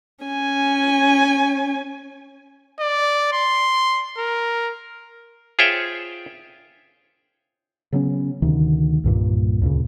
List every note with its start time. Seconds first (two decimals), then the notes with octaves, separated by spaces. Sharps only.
0.24 C#4 G#5
2.80 D5
3.33 C6
4.18 A#4
5.59 F4 G#4 C5 C#5 E5 G5
7.92 C#3 F#3 B3 C#4
8.42 D2 C3 D#3
9.04 C2 G2 A#2
9.61 D2 A#2 C#3